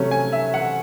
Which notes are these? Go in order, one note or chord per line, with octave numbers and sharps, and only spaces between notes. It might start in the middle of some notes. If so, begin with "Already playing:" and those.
Already playing: C3 F#3 A3 C#4
G#5
E5
F#5